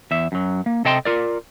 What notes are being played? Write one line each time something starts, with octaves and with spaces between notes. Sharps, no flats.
E2 E5
F#2 F#3
A#3
C3 A4 D#5 G5 A5 C6
F4 A#4 D5